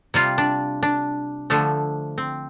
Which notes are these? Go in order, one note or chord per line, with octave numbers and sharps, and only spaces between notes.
C3 G3 F4
D4
D4
D3 F3 A3 D4
C4